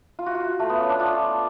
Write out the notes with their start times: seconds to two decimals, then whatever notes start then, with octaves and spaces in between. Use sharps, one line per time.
0.19 F4
0.26 F#4
0.35 F4
0.60 A3
0.69 B3
0.80 C#4
0.90 D4
1.00 F4